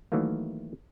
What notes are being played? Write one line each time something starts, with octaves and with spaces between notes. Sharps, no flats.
D#3 E3 F#3 A3 A#3